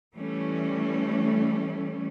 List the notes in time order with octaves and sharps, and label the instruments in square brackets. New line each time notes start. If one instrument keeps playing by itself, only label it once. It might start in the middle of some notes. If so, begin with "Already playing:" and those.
[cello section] E3 G3 A3 C#4